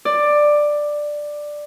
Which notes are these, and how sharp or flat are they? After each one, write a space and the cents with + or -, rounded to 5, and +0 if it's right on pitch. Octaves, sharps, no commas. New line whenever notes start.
D5 +10